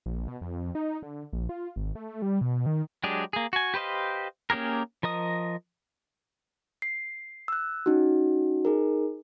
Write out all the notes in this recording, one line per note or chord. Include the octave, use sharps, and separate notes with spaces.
A#1
B2
F2
D#4
D3
A#1
F4
G#1
A3
G3
B2
D#3
F#3 G#3 D4 G4 G#4
A#3 G#4
F#4 G#5
G4 B4 C5 D#5 F5
A#3 C#4 G4 G#4 A#4
F3 A#4 D#5 D#6
C7
E6 F#6
C#4 D#4 F#4
D#4 G#4 A#4